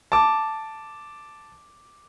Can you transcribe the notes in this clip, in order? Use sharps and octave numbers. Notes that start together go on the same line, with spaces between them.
A5 D6